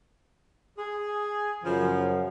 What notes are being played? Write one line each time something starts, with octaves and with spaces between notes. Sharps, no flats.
G#4
F#2 C#3 F3